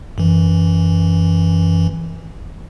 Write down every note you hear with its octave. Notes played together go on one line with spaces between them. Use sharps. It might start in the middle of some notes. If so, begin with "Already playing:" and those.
F#2 E3